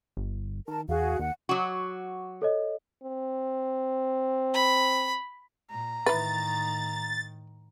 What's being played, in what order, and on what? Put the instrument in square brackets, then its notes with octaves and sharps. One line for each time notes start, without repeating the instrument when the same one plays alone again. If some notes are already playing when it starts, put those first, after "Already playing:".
[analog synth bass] G1
[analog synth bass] D#3 [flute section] A#4 A5
[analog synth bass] E2 [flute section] F#4 G#4 F5
[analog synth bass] D#2 [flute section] F#5
[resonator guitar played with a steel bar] F#3 F#4 [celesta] C#6 D6
[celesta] A4 C#5 D#5
[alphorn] C4
[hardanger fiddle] B5
[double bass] A#2 [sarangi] A#5
[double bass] A2 D#3 [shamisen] E3 B4 [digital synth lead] A6